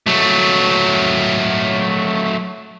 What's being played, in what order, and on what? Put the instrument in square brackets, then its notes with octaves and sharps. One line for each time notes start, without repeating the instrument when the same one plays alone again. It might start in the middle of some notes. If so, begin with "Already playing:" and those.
[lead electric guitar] F#3 A3